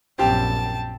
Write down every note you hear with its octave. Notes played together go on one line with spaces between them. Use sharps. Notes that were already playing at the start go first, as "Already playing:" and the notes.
A#1 F#2 C4 G4 A5